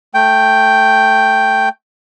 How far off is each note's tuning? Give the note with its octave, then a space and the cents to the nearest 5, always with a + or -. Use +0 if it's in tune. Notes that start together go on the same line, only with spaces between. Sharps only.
A3 +0 G5 +0